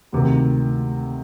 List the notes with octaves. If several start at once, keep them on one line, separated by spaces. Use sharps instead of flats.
D2 C3 D#3